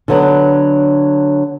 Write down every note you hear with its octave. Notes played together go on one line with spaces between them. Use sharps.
D3 F#3 B3